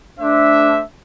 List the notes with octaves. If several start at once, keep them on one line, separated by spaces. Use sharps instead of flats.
A3 D4 C5 E5